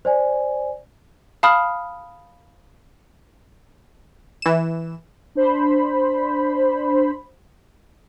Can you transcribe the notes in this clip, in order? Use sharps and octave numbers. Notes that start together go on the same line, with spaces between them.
C5 D5 G#5
F5 A5 B5 D#6 F6
E3 E7
D4 C5 B5